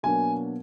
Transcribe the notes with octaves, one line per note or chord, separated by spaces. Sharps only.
B2 F#3 A#3 D4 G#5